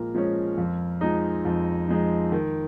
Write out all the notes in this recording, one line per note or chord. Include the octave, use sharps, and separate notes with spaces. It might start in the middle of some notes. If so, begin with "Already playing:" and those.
Already playing: A#2 F3 G#3 A#4
F3 G#3 C#4
F2
F3 G#3 D#4
F2
F3 G#3 D#4
D#3